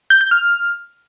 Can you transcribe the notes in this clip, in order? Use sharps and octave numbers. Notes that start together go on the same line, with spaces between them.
G6
G6
F6